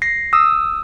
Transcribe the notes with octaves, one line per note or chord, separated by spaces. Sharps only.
A#6 C7
D#6 E6